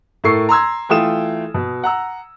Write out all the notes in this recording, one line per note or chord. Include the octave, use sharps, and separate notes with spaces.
A2 A4 A#4 C#6 E6 C7
A#5 C6 E6 G#6
E3 A3 F4 G5 D#6 E7
B2
F#5 A#5 E6